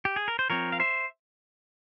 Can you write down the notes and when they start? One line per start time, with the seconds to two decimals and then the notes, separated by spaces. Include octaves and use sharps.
0.05 G4
0.16 G#4
0.28 A#4
0.39 C5
0.50 F3 C4 A#4 C#5
0.72 F5
0.80 C5 E5